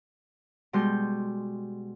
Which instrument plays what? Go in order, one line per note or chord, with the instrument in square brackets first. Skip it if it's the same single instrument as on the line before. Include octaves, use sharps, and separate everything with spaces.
[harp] B2 G3 G#3 C6 G6